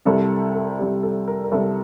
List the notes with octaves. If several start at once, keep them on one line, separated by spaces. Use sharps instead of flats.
C2 C3 G3 A4
A4
C2 C3 G3 G4
A4
A#4
A#4
C2 C3 G3 A4